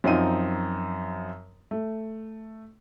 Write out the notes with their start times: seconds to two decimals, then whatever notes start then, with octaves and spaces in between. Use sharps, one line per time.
0.04 F#2 F3 C4 D#4 D#7
1.71 A3